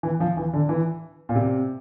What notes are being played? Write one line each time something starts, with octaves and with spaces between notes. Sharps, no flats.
E3
F3
E3
D3
E3
A#2
C3